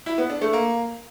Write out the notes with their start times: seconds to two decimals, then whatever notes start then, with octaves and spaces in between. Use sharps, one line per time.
0.06 E4
0.18 B3
0.30 D4
0.41 A3
0.53 A#3